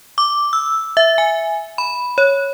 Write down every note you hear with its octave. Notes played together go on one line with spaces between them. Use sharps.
D6
E6
E5
G#5
B5
C#5